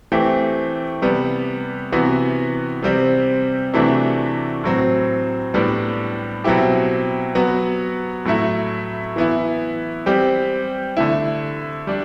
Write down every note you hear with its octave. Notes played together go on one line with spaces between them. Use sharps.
E3 A3 C4 G4
C3 G3 B3
C3 E3 B3 F#4
C3 G3 C4
C3 E3 A3 D4 F#4
A2 F#3 C4
A2 G3 B3 D4
B2 F#3 C4 E4 G4
F#3 B3 F#4
A2 F#3 A3 E4
E3 B3 E4
G3 C4 G4
D3 A3 E4
G3 D4